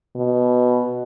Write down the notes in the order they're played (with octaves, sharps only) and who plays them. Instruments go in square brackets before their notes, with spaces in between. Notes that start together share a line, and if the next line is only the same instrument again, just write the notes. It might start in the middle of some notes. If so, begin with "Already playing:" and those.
[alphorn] B2